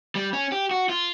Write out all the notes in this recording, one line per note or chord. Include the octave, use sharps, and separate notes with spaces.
G3
C#4
G4
F#4
F4